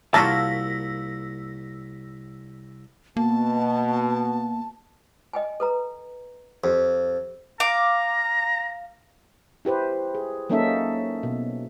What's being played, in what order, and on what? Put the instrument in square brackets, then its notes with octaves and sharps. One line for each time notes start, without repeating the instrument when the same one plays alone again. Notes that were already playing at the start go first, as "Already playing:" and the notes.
[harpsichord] C2 [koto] A#3 F4 F#4 [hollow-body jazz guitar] A5 [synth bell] E6 A#6 B6
[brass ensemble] B2 [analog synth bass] A#3 [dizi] A5
[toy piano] D#5 G5 G#5
A4 B4 A#5
[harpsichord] F2 [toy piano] G4 F5
[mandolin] F5 D6 [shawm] A#5
[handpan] E4 G4 B4 C5
G#4
F#3 A#3 C#4 D#4 A4 E5
B2